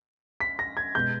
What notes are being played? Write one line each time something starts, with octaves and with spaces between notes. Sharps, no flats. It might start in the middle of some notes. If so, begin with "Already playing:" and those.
B6
A#6
G#6
B2 G#3 B3 G6